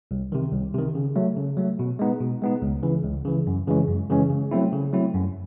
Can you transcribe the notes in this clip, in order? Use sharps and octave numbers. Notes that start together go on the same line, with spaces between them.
C2
C3 D#3
C2
C3 D#3
C#3
F#3 A3
C#3
F#3 A3
B2
G#3 B3 D#4
B2
G#3 B3 D#4
C#2
C#3 E3
C#2
C#3 E3
F#2
C#3 E3 G#3 C#4
F#2
C#3 E3 G#3 C#4
C#3
F#3 A3 C4 E4
C#3
F#3 A3 C4 E4
F#2